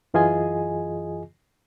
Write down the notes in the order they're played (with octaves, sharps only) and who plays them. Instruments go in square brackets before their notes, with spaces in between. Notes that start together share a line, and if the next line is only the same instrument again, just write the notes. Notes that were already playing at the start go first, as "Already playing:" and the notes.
[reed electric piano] F#2 E3 F4 G#4 D#5 G#5